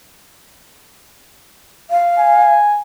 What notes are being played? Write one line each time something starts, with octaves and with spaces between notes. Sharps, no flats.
F5
G#5